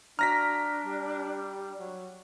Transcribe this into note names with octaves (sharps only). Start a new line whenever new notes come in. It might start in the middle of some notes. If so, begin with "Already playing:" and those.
D4 F#4 A#5 F6 A#6 B6
G3
F#3